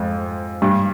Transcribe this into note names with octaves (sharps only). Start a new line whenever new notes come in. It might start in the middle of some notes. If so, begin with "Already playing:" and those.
Already playing: F2 G#2
G2